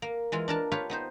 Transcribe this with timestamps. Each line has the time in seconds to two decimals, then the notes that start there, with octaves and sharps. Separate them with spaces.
0.02 A#3
0.32 E3 G#3 F4
0.48 D4 A#4 A5
0.72 F4 G4 B4 C#5 F5
0.90 B3 D#4 C5